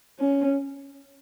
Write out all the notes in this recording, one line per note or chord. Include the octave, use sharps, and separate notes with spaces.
C#4